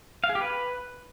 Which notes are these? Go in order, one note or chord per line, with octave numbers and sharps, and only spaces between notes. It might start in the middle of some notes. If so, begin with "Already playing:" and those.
F5
G#4
G4
B4